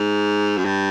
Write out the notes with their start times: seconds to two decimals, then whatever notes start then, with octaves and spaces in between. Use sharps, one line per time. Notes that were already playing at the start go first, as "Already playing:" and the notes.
Already playing: G#2
0.58 F#2
0.65 G2